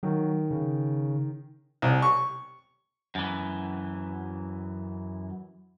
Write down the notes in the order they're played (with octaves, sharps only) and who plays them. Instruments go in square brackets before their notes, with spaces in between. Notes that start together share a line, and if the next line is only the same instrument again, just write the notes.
[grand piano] D#3 [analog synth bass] F#3
[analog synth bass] C#3
[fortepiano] C2
C#6
[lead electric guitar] F#2 E3